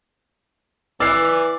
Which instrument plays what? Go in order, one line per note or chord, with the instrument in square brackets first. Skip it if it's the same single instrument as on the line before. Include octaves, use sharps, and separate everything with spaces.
[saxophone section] E3 [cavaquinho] D5 [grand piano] E6 F6 C7